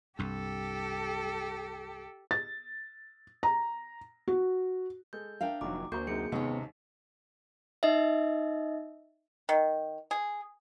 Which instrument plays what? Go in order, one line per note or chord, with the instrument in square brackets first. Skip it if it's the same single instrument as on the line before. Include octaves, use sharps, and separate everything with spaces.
[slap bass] C2 G2 [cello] G4 A4
[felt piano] A6
A#5
F#4
[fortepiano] G#3 A4 [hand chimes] G6
[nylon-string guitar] D4 E5 F5 [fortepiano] A#4 G5
[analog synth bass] F1 [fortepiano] A#2 D#3 F#3 [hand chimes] D6
[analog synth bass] D2 [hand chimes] A#3 F#4 G6 [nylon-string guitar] A#4 [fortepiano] C5 A#5 C#6
[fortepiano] F#2 C3 D#4 [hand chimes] G#4 C#7
[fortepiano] D#2 G#2 [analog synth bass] C3 [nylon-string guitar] B3 C#4
[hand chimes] D#4 D#5 E5
[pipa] D#3
G#4